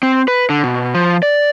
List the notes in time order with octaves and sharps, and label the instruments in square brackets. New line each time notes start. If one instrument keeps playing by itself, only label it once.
[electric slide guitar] C4
B4
D3
B2
F3
D5